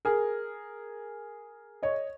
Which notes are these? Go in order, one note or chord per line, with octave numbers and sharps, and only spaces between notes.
G#4 A#4
C#5 D#5